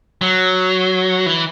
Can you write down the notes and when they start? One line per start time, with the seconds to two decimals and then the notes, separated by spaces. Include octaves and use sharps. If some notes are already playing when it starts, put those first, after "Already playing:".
0.21 F#3
1.26 E3